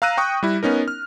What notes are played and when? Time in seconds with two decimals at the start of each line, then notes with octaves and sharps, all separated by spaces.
0.02 F5 A#5 E6 F#6 A#6 D#7
0.17 G5 C#6 D#6
0.43 G3 E4
0.63 B3 C#4 D#4 A#4
0.88 F6